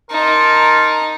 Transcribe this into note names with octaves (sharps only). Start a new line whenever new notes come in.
D#4 A#4 A5 C6